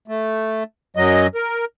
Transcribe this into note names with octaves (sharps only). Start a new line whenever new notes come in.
A3
F#2 F#3 D#5
A#4